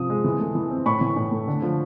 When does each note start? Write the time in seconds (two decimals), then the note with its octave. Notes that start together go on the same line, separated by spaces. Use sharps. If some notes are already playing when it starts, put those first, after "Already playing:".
Already playing: C3 F3 C4 D#6
0.10 G#3
0.24 E3
0.40 A3
0.55 E3
0.71 C4
0.86 A2 B5 C#6
1.01 E3
1.16 A2
1.31 A3
1.47 D3
1.62 F3